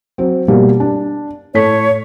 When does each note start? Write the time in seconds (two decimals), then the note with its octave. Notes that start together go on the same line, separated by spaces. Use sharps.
0.18 F#3 C4
0.48 B2 G3 A#3
0.80 D4
1.54 A2 A4 C#5 B6